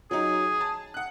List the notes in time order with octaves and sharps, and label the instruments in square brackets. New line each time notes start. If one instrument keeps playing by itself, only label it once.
[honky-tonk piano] F#3 D#4 [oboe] G#4
[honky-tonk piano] A5
F#5 F#6